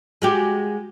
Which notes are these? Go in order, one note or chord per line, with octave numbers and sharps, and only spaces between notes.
G#3 F#4 G4